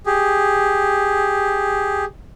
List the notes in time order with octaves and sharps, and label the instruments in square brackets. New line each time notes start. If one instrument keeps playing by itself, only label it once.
[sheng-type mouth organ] G4 G#4